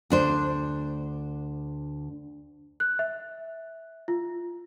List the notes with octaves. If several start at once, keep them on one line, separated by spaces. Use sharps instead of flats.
D2 D4 C5
F#6
E5
F4